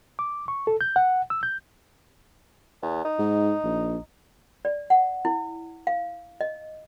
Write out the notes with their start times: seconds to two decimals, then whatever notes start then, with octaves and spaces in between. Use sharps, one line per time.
0.19 D6
0.48 C#6
0.67 A4
0.81 G6
0.96 F#5
1.30 E6
1.43 G6
2.82 E2
3.04 D#4
3.19 G#2
3.64 A#1
4.65 D5
4.90 F#5
5.25 E4
5.87 F5
6.41 D#5